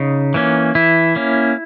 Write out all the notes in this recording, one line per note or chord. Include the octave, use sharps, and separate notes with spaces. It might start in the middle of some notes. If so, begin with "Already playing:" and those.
Already playing: C#3 D#4
E3 A#3 C#4
E3 E4
A#3 C#4